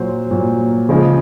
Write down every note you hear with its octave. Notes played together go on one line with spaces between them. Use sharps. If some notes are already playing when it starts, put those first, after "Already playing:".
Already playing: A#2 F#3 C5
A#2 F#3
C#3 F3 G#3